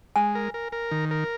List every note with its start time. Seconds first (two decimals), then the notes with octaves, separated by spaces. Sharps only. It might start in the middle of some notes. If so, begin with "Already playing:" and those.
0.16 G#3 G#5
0.35 A#4
0.54 A#4
0.72 A#4
0.91 D#3
1.11 A#4